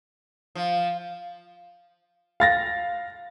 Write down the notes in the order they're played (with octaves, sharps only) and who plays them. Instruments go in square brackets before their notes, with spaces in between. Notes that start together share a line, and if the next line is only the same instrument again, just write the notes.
[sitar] F3
[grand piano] F5 A6 A#6